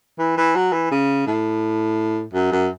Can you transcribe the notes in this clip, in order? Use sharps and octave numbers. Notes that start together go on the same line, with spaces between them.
E3
E3
F#3
E3
C#3
A2
F#2
F#2